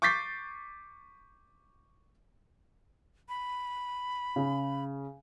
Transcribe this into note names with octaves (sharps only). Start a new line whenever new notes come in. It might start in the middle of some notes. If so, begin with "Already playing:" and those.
C#6 D6 G6 A6 B6 C7
B5
C#3